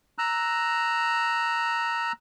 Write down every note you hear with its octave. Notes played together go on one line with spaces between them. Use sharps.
A#5 E6 F#6